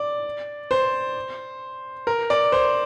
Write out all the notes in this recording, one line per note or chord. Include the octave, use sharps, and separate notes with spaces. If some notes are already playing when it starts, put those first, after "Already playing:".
Already playing: D5
C5
A#4
D5
C5